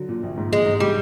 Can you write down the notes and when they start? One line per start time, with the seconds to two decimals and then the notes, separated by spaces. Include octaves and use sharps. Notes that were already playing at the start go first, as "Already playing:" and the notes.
Already playing: D3 F#3
0.09 A#2
0.23 A#1
0.37 G#2
0.52 A#1 G#3
0.66 G#2
0.80 G3 G#3